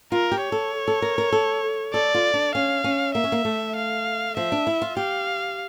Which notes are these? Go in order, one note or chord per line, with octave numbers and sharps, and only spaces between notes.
F4 A#4
G4
C#5
A4
A4
A#4
A#4
A4
A4 D5
F4
D4
C#4 F5
C#4
A#3 E5
C#4
A#3
A3
F5
F3 E5
D4
E4
F4
G4 F5